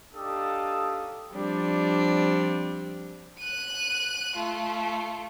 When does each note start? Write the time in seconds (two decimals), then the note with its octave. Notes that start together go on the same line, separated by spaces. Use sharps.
0.12 D4 D#4 G4 A4 F5 D#6
1.31 F3 G3 C4 D4
3.39 F#6 D#7
4.36 A3 F4